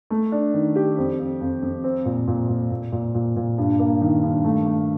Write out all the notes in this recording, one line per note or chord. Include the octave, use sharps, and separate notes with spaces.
A3
D4
D#3
G4
F2
F2
F2
F2
C4
A#2
A#2
A#2
A#2
A#2
A#2
A#2
G2
A#3
D#3
G2
A3
A3